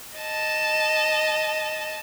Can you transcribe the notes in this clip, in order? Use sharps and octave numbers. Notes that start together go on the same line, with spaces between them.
D#5 A5